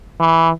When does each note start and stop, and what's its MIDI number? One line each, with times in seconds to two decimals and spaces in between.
0.20 0.50 52